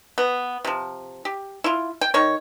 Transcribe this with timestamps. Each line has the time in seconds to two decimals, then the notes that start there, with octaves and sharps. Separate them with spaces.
0.18 B3
0.65 C3 F3
1.25 G4
1.64 E4 F4
2.01 G5
2.14 D#3 C#5